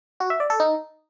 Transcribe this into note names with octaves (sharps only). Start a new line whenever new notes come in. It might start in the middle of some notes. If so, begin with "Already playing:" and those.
F#4
E5
D5
A4
D#4